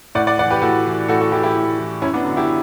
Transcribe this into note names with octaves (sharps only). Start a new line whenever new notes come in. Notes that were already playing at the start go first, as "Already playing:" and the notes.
A2 D5 F#5
D5 F#5
E3 D5 F#5
G4 B4
A2 F#4 A4
E3
A2 F#4 A4
F#4 A4
E3 E4 G4
E4 G4
A2
E3
F#2 C#4 E4
B3 D4
D3 F#3
E4 G4